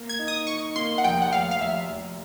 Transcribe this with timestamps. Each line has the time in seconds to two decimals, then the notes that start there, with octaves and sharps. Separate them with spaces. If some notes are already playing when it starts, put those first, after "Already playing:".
Already playing: A#3
0.09 G#6
0.19 D#4
0.28 D#6
0.47 D#4 C#6
0.76 A#3 C6
0.98 F#5
1.04 F1 G5
1.22 F#5
1.33 F1 F5
1.51 F5
1.61 F1 E5
1.89 F1